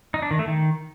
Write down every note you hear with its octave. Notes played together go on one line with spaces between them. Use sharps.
D#4
D4
D#3
A3
D#3